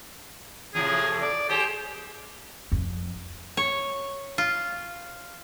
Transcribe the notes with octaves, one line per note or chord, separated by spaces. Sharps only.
E2 A2 C3 G#4
D5
G4 G#4 C5
F2
C#5
F4